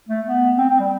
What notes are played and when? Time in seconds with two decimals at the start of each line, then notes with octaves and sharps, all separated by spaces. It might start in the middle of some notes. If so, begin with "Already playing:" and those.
0.09 A3
0.27 B3
0.58 C4
0.70 C4
0.80 G3